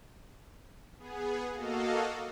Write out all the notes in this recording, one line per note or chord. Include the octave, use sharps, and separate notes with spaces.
B3 G#4
A#3 F#4 A4 D#5 F5